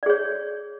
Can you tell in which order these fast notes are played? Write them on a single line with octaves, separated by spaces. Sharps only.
D5 G#4 C#5